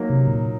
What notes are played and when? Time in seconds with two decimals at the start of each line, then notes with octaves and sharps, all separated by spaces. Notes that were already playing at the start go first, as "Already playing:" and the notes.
Already playing: F#3 A#3 D#4
0.10 C3
0.28 A#2